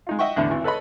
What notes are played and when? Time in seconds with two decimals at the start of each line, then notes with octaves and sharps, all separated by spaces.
0.07 G#3 D#4 F4
0.19 D#5 E5 F#5 G5 C#6
0.36 E2 A2 D3 D4
0.50 G#1 E3
0.64 A4 B4 C#5 D#5 B5